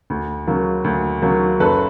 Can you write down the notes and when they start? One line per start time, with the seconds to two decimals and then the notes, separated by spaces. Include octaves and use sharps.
0.10 D2
0.47 C#3 F#3 A#3
0.84 D2
1.22 C#3 F#3 A#3
1.60 F#1 A4 B4